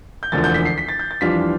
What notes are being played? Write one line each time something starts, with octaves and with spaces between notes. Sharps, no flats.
G6
E1 D2 D3 F3 A6
G6
B6
C7
B6
A6
G6
A6
F2 E3 G3 D4 F4 B6